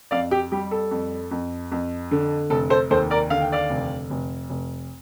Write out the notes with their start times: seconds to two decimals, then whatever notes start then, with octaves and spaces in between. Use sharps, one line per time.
0.11 F2 D5 F5
0.31 G4
0.52 G3 G4
0.71 A4
0.91 F2
1.31 F2
1.71 F2
2.11 D3
2.50 F1 A4
2.70 A4 C5
2.90 D#2 A4 C5
3.11 A#4 D5
3.30 D3 F5
3.41 G5
3.52 D5 F5
3.70 F1
4.10 F1
4.49 F1